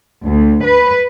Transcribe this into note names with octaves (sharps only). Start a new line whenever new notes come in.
D2
B4